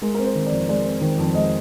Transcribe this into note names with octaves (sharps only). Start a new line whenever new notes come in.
G#3 A#4
C4 A#4
C5
D#3
D5
F2
G#3 D5
C4
D#3
F2
G#3 D#5